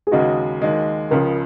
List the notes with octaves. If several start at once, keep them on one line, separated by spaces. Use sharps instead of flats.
G#4
D#2 C#3 G#3 D#4 F#4
D#2 D#3 G#3
C#2 C#3 F3 A#4